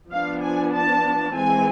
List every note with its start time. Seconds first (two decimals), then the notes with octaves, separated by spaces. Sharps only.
0.11 F3 B3 D4 F5
0.42 G#5
0.73 A5
1.35 E3 G#3 C4 G#5